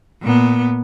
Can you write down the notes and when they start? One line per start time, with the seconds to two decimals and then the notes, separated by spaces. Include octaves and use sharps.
0.22 A#2 B3